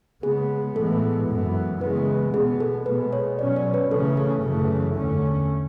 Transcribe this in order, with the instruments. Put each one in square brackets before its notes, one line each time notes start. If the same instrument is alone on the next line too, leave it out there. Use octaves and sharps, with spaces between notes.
[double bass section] C#3 G#3 B3 [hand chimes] G#4
[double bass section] A2 E3 G#3 B3 [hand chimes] A4
[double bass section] F#2 E3 B3
[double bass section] C#3 E3 G#3 B3 [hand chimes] B4
[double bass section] B2 G#3 B3 [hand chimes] G#4
[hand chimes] A4
[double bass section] B2 G#3 B3 [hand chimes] B4
[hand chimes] C#5
[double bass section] B2 F#3 C#4 [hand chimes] D5
[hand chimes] C#5
B4
[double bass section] C#3 E3 A3 C#4 [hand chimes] A4
[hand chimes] A4
[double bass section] F#2 C#3 E3 A3
E2 D3 A3 C#4